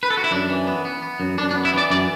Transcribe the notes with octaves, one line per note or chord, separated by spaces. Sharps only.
B4
A4
F#4
E4
F#2 D4
E3
B3
B3
B3
F#2
F#2 D4
D4
B3
E4
E3 D5
F#2 D5